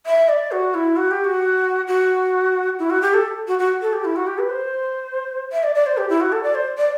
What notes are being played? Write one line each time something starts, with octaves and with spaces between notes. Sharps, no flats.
E5
D5
F#4
E4
F#4
G4
F#4
F#4
E4
F#4
G4
A4
F#4
F#4
A4
G4
E4
F#4
G4
B4
C5
E5
D5
D5
C5
G4
E4
F#4
A4
D5
C5
D5